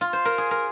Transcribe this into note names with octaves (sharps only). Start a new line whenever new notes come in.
F4
C5
A#4
G#4
A#4